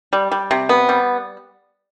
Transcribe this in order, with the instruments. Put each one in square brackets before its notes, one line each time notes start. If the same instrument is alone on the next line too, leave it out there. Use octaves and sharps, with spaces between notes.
[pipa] G3
G3
C3
B3
G3